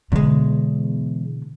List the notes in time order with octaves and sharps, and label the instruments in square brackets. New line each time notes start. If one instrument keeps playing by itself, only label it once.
[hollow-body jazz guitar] E2 G#3 [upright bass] B2 D3